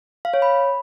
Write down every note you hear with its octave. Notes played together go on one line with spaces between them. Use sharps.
F5
C#5
B5